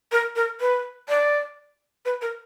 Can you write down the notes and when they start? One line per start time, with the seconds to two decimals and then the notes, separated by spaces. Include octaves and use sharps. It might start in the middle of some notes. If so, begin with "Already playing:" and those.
0.12 A#4
0.36 A#4
0.61 B4
1.09 D5
2.05 B4
2.22 A#4